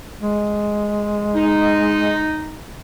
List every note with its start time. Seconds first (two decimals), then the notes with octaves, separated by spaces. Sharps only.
0.20 G#3
1.35 D#4